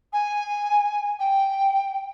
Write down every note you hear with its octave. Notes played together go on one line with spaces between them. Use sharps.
G#5
G5